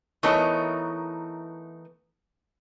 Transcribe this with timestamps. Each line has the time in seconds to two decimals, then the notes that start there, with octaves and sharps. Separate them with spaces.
0.23 E3 A3 B3 D#4 A#4 C#5